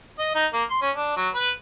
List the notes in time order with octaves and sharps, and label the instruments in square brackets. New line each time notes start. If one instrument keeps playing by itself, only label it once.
[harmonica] D#5
D#4
A#3
C6
C#4
D4
F#3
B4